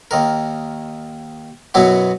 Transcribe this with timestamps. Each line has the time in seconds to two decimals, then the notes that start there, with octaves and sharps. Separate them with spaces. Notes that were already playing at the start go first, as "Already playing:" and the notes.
0.11 D#2 D#3 A#4
1.74 F#2 B2 F#3 B3 E4 F#4